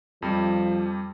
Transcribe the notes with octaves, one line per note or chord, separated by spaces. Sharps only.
F2 F3 G3